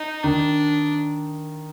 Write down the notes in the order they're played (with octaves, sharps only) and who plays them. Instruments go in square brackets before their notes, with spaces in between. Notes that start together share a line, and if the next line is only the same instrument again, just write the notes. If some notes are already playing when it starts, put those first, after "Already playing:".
Already playing: [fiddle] D#4
[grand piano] D#3 [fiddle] D4